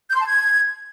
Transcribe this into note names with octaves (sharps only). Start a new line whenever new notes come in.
G6
C6
A5
G#6